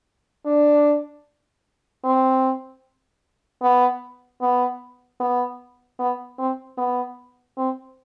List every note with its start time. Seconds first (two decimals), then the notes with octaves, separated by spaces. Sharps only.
0.46 D4
2.05 C4
3.62 B3
4.41 B3
5.20 B3
5.99 B3
6.39 C4
6.78 B3
7.57 C4